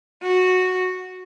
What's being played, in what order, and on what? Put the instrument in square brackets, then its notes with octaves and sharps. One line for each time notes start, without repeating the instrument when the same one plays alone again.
[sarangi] F#4